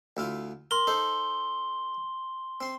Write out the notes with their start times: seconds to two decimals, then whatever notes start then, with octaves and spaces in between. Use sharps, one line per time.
0.17 D2 E4 F4
0.71 A#4 C6 G7
0.87 D#4 A4 C5
2.61 C4 C6